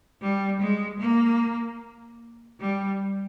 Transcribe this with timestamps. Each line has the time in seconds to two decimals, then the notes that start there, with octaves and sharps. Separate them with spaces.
0.21 G3
0.60 G#3
1.00 A#3
2.60 G3